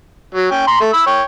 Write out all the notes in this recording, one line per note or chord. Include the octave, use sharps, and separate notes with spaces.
F#3
C#4 G5
A#5 C6
A3
B5 E6
C#5 G5